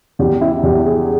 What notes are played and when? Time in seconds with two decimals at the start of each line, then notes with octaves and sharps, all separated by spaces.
0.19 E2 G4
0.41 E4
0.63 E2 G4
0.85 G#4